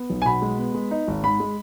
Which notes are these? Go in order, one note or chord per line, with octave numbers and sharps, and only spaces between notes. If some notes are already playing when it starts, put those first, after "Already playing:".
Already playing: B3
B1
G#5
B2 B5
G#3
B3
G#3
D#4
G#1
G#2 B5
G#3